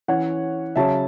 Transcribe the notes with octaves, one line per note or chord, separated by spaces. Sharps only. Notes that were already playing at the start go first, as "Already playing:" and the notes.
E3 C#4 C#5 F#5
C#3 F#3 C#4 E5 A5